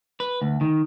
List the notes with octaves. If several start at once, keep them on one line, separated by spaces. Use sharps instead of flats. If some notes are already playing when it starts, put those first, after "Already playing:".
B4
D2
D#3